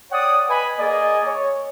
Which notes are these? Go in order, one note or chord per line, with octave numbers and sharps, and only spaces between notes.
C#5 D5 F#5 G5 D#6
B4 D#5 G#5 B5
A#3 G#4 D5 D#5 G#5
C#5